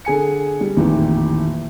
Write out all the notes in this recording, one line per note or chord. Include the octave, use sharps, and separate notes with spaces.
D3 G#4 G#5 C#7
G3
A1 F2 A#2 D#3 E3